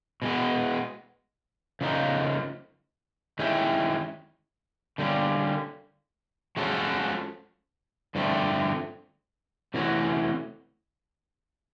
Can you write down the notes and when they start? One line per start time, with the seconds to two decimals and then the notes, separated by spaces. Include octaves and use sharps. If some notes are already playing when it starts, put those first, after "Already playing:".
0.22 B2 G#3 B3
1.81 C#3 F3 A#3 D#4
3.39 D#3 G#3 C#4 E4 G4
4.98 D3 G3 A#3 C#4
6.57 F3 G#3 C#4 F#4 A4
8.15 G2 D3 F3 A3 C4
9.74 C3 E3 A3 C#4 F#4